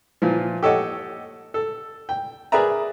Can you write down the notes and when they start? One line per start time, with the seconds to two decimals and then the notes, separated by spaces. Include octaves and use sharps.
0.22 A#2 E3 F3
0.63 G4 A4 C#5 D#5 F#5
1.54 A4
2.09 G5
2.52 G#4 A#4 B4 D5 E5 A#5